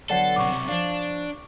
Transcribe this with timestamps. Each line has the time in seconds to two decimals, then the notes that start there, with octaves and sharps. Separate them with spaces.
0.10 D3 F#3 B3 A4 D5 F#5 C7
0.36 B1 C3 C#6 D6
0.68 F3 D4 F5